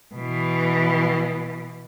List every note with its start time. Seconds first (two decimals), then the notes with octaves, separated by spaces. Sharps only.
0.15 B2 E3